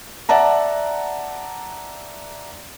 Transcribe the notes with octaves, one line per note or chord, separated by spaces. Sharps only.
D5 E5 F#5 A5 A#5